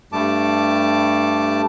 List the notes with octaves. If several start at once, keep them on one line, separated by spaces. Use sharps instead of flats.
G2 G3 A3 A5 D6